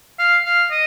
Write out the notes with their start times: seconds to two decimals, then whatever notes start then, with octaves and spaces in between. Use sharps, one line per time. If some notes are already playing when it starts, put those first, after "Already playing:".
0.19 F5
0.45 F5
0.71 D#5